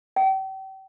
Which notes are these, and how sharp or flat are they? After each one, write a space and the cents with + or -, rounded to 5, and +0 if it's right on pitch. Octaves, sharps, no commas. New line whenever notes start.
G5 -40